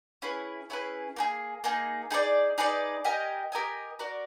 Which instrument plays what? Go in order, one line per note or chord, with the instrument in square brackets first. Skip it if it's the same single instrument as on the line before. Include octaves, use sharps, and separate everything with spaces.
[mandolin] C#4 E4 G#4 B4
C#4 E4 G#4 B4
A#3 D#4 G#4
A#3 D#4 G#4
D#4 G#4 B4 D5
D#4 G#4 B4 D5
G4 A#4 D#5 G#5
G4 A#4 D#5 G#5
F#4 A#4 D5